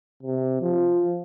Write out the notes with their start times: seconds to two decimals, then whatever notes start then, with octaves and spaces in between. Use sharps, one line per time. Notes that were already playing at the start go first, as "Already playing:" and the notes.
0.23 C3
0.61 F3